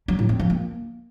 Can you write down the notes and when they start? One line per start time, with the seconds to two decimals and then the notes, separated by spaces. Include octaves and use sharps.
0.08 F#3
0.19 A2
0.29 C4
0.39 F3
0.50 A#3